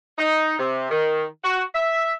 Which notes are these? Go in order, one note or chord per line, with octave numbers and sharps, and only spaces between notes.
D#4
C3
D#3
F#4
E5